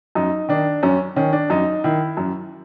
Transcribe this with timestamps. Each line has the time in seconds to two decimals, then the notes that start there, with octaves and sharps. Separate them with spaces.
0.15 F#2 D#4
0.49 D#3 D4
0.83 F#2 C#4
1.16 D#3 C#4
1.33 D4
1.50 F#2 D#4
1.84 D#3 E4
2.17 F#2